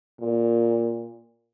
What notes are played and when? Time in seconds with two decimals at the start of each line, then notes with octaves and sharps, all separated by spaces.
0.21 A#2